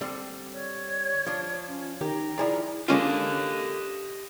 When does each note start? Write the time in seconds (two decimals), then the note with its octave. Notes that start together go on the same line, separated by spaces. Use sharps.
0.01 D3 G3 C4
0.53 C#5 D5
1.26 F3 D4
1.66 C#4 F4
2.01 D#3 G4 G5 A#5
2.38 D#3 F3 G#3 E4 G#4 D5
2.88 D3 G#3 A#3 C#4 F4 G4 D#5